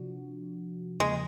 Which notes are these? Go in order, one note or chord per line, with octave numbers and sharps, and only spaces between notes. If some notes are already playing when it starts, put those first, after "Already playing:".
Already playing: C3 F3 D4 F#4
E2 C#3 F3 G#3 A#3